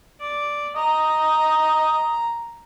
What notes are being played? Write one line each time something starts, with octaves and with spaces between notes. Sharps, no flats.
D5
D#5 A#5